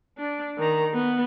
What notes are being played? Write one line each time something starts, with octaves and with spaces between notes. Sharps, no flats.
D4
D#3 A#5
B3